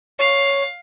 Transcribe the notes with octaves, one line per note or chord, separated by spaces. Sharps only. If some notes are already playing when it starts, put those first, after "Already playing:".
C#5 F5